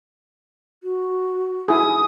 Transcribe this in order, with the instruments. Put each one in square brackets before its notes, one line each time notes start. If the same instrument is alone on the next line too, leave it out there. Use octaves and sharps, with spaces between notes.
[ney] F#4
[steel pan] E4 G#4 [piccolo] D#6